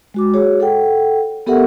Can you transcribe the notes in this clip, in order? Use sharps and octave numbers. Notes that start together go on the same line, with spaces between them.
G#3 F#4 D6
F#4 G#4 C#5
A4 F#5 G5
B3 G4 A4 A#4 E5 F#5